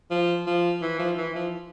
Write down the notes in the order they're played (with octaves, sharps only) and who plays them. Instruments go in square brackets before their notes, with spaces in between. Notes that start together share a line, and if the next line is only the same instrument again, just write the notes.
[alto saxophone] F3
F3
E3
F3
E3
F3